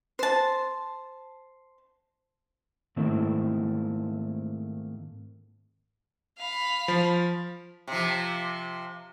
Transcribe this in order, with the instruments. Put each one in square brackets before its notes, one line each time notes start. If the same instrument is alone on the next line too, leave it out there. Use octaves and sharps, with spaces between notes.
[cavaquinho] C5 A5
[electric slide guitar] G#2 D#3 A3 A#3 C4 E4
[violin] F5 B5
[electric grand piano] F3
[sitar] C3 F3